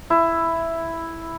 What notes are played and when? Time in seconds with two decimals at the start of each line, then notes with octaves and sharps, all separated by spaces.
0.10 E4